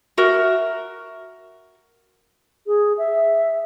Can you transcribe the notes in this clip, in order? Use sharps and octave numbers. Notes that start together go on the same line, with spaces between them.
F#4 A#4 E5
G#4
E5